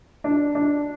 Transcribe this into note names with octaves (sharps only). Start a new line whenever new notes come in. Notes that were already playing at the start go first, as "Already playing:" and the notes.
D4
D4